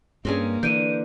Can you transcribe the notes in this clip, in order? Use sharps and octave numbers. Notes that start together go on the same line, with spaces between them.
G2 A#3 C4 C#4 G#4
D3 E3 G6 D7 D#7